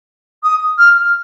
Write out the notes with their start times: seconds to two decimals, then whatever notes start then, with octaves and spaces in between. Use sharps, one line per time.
0.43 D#6
0.78 F6